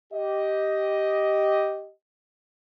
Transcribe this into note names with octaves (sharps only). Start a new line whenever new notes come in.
G4 D#5